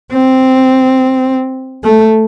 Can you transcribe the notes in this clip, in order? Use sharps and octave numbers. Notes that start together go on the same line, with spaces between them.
C4
A3